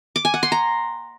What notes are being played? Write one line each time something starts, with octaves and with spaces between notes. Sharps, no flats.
D6
G#5
F#5
C6
A#5